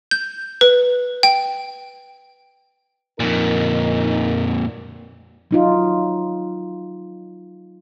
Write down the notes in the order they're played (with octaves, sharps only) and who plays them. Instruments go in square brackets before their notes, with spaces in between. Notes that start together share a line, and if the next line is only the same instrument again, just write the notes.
[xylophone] G6
B4
G5
[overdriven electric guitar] F2 A#2 [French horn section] D#4 A#4
[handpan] F#3 D#4 F4